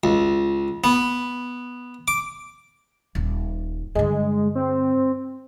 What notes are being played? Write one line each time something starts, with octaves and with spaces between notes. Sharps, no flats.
C#2
B3
D6
D#1
G2 D3 G#3
C4